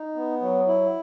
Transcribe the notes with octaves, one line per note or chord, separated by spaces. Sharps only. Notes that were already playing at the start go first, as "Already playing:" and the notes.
Already playing: D#4
B3
F#3
E4